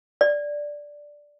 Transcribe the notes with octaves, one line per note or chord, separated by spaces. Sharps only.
D5